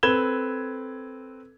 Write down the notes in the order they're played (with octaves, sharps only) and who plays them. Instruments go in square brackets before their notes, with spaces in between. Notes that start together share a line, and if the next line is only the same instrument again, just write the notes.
[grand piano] C4 A4 B4 G#6 E7 G7